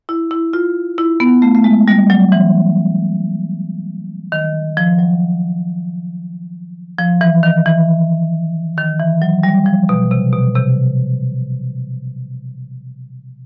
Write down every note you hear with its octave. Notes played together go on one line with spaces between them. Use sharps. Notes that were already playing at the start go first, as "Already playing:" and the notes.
E4
E4
F4
E4
B3
A3
A3
G#3
G3
F#3
E3
D#3
F3
F#3
F3
E3
D#3
E3
D#3
E3
F#3
G3
F3
B2
C3
B2
C3